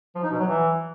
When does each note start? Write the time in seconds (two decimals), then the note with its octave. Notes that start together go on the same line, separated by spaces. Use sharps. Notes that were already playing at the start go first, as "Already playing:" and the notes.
0.15 F3
0.23 D#4
0.31 B2
0.39 F#3
0.47 E3